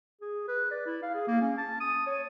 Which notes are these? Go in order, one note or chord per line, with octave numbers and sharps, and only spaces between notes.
G#4
B4
D5
E4
F5
G#4
A#3
C#4
A5
D#6
C#5